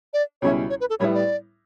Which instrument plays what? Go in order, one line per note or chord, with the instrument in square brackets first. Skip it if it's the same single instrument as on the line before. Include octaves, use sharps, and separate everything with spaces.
[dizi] D5
[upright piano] C#2 B2 G3 C#4 E4 [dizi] C#5
[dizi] C#5
B4
A4
[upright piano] A2 G3 B3 E4 [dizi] C#5
[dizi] D5